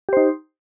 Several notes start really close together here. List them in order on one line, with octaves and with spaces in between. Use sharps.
G4 C5 D#4